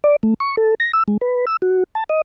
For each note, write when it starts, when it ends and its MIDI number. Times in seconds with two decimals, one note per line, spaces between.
0.04 0.16 74
0.23 0.34 57
0.40 0.56 85
0.57 0.75 69
0.80 0.92 94
0.93 1.03 88
1.08 1.17 56
1.21 1.45 71
1.47 1.57 88
1.62 1.83 66
1.95 2.04 81
2.09 2.22 75